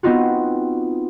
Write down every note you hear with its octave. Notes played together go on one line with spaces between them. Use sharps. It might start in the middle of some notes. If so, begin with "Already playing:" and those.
B3 C4 D#4 F4 F#4